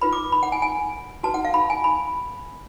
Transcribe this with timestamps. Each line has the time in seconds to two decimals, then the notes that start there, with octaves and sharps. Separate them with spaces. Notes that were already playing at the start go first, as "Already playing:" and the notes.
0.01 F4 B4 B5
0.13 D6
0.32 B5
0.43 F#5
0.52 G#5
0.62 G#5
1.23 F#4 B4 A5
1.34 F#5
1.45 F5
1.54 B5
1.70 G#5
1.84 B5